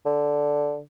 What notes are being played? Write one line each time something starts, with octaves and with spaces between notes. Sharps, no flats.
D3